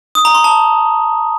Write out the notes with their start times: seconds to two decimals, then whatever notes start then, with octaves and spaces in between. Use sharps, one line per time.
0.15 D#6
0.25 A#5
0.35 C6
0.44 A5